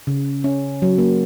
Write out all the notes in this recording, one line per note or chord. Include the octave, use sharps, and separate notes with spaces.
C#3
C#4
F#3
A#3